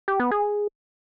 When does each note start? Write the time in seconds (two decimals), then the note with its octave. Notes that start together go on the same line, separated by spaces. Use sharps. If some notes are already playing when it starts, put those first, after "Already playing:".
0.08 G4
0.20 B3
0.31 G#4